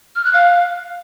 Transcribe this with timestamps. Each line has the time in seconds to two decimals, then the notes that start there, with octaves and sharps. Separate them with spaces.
0.16 F6
0.24 F#6
0.33 F5